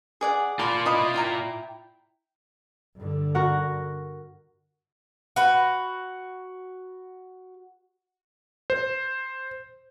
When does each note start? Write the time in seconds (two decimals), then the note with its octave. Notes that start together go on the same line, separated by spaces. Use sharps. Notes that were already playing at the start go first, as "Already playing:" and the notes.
0.21 G#4 D5 F#5
0.59 F4 D5 A5 B5 C6
0.86 E4 D#5 B5
1.14 E4 G5 A#5
2.96 G2 D3
3.35 F#4 A#4 F#5
5.36 F#4 B4
8.70 C5